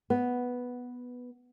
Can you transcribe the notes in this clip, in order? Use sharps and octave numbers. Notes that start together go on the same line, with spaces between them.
B3